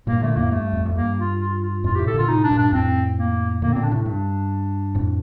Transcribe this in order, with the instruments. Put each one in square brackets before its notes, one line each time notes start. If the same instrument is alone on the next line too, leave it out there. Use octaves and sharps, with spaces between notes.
[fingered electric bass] G2 A#2 [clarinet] A#3
[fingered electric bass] A#2 D3 [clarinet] A3
[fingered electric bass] F2 A2 [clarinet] A#3
[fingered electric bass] G2 [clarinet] A3
[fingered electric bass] F2
F2
[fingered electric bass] G2 [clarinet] A#3
[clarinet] F4
F4
F4
[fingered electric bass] F2 A2 [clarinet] F4
[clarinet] G4
[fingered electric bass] A2 C3
[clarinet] A4
[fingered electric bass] A#2 D3 [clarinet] F4
[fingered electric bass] A2 C3 [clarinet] D#4
[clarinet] D4
[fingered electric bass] G2 A#2
[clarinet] D4
[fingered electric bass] F2 A2 [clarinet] C4
[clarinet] A#3
[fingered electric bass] A#2 D3 [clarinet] A#3
[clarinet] C4
[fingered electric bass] A#2 D3
[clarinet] D4
[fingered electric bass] A2 C3
[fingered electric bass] G2 [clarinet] D4
[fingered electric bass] F2 A2